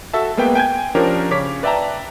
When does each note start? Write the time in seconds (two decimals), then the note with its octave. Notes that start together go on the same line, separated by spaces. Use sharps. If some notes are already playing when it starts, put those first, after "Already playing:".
0.13 F#4 A4 E5 A5
0.37 G#3 A#3 B3 B4 G5
0.55 G5 G#5 G6 G#6
0.95 F3 C#4 D4 G4 A#4
1.31 C#3 C#5 D6 B6
1.63 B4 D5 E5 G5 A5 A#5